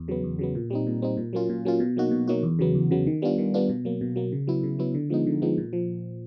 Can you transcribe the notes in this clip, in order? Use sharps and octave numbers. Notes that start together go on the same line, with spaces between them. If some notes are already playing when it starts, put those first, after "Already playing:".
Already playing: E2
C#3 F#3 B3
E2
C#3 F#3 B3
A#2
G3 C4 D#4
A#2
G3 C4 D#4
A#2
F#3 A#3 C#4 F4
A#2
F#3 A#3 C#4 F4
B2
F#3 A#3 D#4 F#4
B2
F#3 A#3 D#4 F#4
E2
C#3 F#3 B3
E2
C#3 F#3 B3
D#3
G3 B3 D4 F4
D#3
G3 B3 D4 F4
B2
F#3 A#3
B2
F#3 A#3
C#3
F#3 B3 E4
C#3
F#3 B3 E4
D3
F3 G#3 B3 D#4
D3
F3 G#3 B3 D#4
A#2
F3